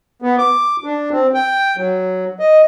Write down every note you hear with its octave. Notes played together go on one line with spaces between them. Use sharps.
B3
D6
D4
C4
G5
F#3
D#5